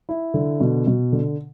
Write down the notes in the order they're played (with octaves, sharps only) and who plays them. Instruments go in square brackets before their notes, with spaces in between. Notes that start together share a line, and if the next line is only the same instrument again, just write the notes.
[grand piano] E4
D3
B2
B2
D3